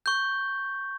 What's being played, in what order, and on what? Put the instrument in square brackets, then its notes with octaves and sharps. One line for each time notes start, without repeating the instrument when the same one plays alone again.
[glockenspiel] C#6 G6